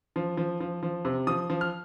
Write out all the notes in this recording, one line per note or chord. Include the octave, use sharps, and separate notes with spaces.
F3
F3
F3
F3
C3
F3 D#6
F3
F6